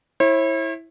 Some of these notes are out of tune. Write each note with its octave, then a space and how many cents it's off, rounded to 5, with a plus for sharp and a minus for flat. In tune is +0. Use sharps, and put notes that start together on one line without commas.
E4 -5 C#5 -45